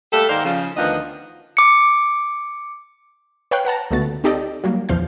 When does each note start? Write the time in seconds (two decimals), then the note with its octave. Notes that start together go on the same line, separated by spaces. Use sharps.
0.12 G3 A3 A#3 A4
0.29 G#2 D#3 A#3 C5 D5 F5
0.45 C#3 F3
0.77 D2 D#3 F3 B3 D4 D#5
1.57 D6 C#7
3.51 B4 C#5 F5 G5 F#6
3.65 B4 F#5 A5 A#5
3.91 C#2 D3 A3 B3 F#4 A6
4.24 C4 D#4 G4 A4 D5 D#5
4.64 F#3 G3 A#3
4.89 A#1 E2 F3 F5 G6